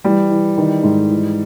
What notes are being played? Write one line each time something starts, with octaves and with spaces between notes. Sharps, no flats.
E3 G3
E3
D#3
G#2
E3